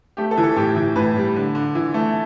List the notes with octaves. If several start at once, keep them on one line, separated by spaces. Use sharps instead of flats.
A3 G4
A4
E3
A4
A2 G4
E3
A2 B4
G3
D3
D3
E3
A3